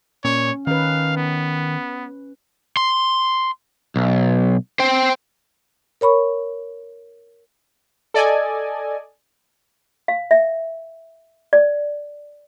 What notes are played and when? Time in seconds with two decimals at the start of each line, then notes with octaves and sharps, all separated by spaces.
0.25 A#2 C#4 C#5
0.67 D#3 C#4 B4 F5
1.17 B3
2.77 C6
3.96 B1
4.79 C5 G5
6.01 A#4 C#5 B5 C#6
8.14 A4 D5 D#5 G#5
10.08 F5
10.31 E5
11.53 D5